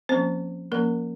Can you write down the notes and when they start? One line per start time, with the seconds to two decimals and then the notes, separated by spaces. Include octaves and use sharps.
0.09 F3 A#3 C4 C#4 C5
0.72 F3 A#3 C#4 A#4